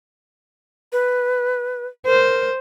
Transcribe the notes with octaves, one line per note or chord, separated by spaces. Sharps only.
B4
A#4 C5